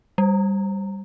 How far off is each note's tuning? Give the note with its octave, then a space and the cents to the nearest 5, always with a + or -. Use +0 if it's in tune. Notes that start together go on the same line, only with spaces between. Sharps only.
G3 +5